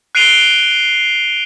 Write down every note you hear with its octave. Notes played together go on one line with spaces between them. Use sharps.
F#6 C7 D7 D#7 F7 G7